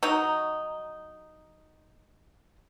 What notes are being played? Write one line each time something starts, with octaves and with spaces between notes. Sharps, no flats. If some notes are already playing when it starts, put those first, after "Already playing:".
F#3 D#4